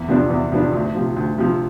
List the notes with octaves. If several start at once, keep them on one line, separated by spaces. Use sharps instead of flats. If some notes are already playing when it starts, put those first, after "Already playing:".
Already playing: E2
C3 F3 B3 D4
E2
C3 F3 B3 D4
D2
C3 F3
D2
C3 F3